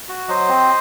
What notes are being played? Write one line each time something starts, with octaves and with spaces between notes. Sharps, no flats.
F#4
F#3 C5 D#5
C4